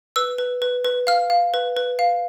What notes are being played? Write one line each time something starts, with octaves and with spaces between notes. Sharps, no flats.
B4 E6
B4
B4
B4
F5 F6
F5
B4
B4
F5